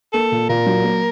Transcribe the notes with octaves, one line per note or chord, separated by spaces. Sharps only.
A#3 A4
A#2
A#2 A#4
F#3
A#3